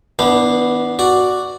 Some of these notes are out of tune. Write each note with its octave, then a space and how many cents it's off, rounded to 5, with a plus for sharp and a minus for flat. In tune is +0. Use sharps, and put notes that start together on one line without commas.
E3 -45 B3 +0 D4 +0
F#4 +0 D5 +0